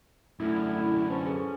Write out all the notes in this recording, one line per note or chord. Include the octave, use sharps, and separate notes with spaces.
F#2 D3 A3 E4 A4 F6
C#4 B4 C5 A5
G#4 A4